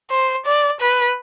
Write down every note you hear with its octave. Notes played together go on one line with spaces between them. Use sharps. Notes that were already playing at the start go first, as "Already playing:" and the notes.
C5
D5
B4